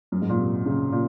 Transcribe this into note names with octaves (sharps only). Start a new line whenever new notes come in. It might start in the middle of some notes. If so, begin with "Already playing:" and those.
F#2
G#2
A#2
C3
C#3
A#2